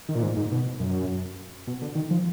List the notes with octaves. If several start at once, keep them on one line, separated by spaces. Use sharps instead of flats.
D#3
A#2
G#2
G#2
B2
F#2
B2
D3
D#3
F3